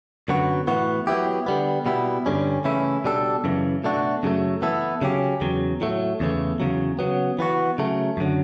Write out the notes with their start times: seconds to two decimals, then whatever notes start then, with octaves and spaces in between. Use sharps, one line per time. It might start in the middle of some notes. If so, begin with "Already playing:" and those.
0.28 F#2 D3 F#3 B3 F#4
0.67 A2 E3 B3 F#4
1.07 F#3 B3 E4 G4
1.46 D3 G3 B3
1.86 B2 G3 B3 E4
2.26 G2 D3 G3 C#4
2.64 C#3 E3 A3 C#4 E4
3.04 B2 G3 D4 A4
3.44 F#2 C#3 E3
3.84 B2 A3 D4 F#4
4.23 F#2 C#3 F#3 A3
4.62 E3 B3 E4 A4
5.02 C#3 F#3 C#4 G4
5.41 E2 C#3 F#3
5.81 A2 F#3 A3
6.20 E2 C#3 E3 A3
6.60 E2 C#3 F#3
6.99 C#3 F#3 B3
7.39 E3 B3 F#4
7.78 C#3 F#3 A3
8.17 F#2 D3 F#3